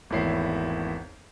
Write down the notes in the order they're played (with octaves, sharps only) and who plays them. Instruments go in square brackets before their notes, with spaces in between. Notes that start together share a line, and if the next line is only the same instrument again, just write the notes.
[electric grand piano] G#1 E2 A3 E4 C#5 C7